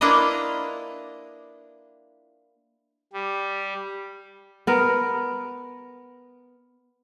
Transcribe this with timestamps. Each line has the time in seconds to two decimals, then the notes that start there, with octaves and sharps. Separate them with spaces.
0.01 A#3 D4 E4 F4 B4 D#5
3.13 G3
4.67 B3 A#4